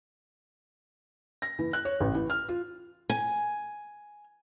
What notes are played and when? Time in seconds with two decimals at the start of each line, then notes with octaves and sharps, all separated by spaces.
1.42 A#6
1.59 E3
1.73 F#6
1.85 C#5
2.00 A1
2.15 E3
2.30 F6
2.49 F4
3.10 G#5